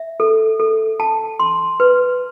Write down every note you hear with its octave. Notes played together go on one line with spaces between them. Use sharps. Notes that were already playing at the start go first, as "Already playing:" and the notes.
Already playing: E5
A4
A4
A5
C6
B4